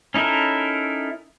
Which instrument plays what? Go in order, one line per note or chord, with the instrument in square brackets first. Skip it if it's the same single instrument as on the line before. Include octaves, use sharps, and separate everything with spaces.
[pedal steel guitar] C#4 D#4 E4 A4 A#4